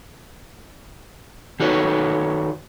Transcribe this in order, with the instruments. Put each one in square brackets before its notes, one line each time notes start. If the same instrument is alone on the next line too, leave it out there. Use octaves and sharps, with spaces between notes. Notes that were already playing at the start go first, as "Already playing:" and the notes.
[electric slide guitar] D#3 D#4 F#4 A4 B4 C#5